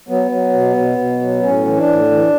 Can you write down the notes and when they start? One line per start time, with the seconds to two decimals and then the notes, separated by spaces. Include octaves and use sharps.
0.09 F#3 B3
0.31 F#3
0.53 B2
0.76 B2
0.98 B2
1.21 F#3
1.43 A2 C#4
1.66 E3
1.77 D4
1.88 A2
2.11 E3